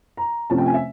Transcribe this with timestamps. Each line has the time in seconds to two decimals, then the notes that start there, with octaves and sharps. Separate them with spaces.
0.17 A#5
0.50 C3 F3 A3 C#4 A5
0.58 G5
0.66 G#5
0.74 E5